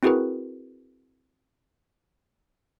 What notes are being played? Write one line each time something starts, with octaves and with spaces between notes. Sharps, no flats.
C4 E4 F#4 G#4 A#4 B4